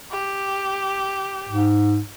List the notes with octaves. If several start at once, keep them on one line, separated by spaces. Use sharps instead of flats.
G4
G#2